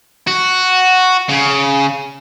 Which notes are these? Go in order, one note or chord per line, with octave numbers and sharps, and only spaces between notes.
F#4
C#3